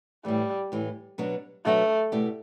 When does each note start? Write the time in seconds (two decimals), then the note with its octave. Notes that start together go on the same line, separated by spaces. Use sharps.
0.25 A2 E3 G3 A3
0.72 A2 E3 A3
1.18 B2 F#3 B3 D4 F#4
1.65 B2 F#3 A3 B3 D4 F#4
2.12 B2 A3 E4 G4 D5